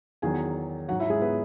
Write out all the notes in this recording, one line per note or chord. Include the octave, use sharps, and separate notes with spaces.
E2 D#3 F#3 G#4 G#5
G#2 F#3 F#4 F#5
E4 E5
G#3 G#4
B3 B4